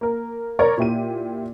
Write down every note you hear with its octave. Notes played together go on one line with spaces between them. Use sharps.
A#3 A#4
A#4 C#5 D5 A#5 C#6
A#2 E4 G4 D#7